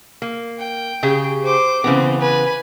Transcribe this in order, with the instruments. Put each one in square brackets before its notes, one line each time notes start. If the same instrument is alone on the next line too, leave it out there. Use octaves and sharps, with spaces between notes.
[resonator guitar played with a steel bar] A#3
[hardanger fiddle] G5
[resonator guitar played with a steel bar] C#3 G4 G#4
[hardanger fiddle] C5 D6
[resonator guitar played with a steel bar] C#3 E3 B3 [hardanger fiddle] C4
[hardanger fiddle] B4 G#5